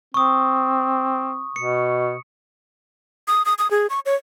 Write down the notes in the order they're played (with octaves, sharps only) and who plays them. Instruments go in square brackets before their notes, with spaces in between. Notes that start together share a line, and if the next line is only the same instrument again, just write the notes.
[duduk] C4 [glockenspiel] C#6 D#6
[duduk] B2 [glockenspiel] C#7
[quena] D#6
D#6
D#6
G#4
C#6
C#5